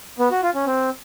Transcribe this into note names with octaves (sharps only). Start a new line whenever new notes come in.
B3
F#4
F4
C#4
C4